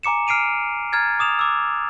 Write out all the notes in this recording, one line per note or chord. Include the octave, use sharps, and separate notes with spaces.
G#5 A#5 D6 C#7 E7
F6 C7 D7 D#7 F7
A#5 F6 G#6 A6
D6 D#6 E7 F7
D6 E6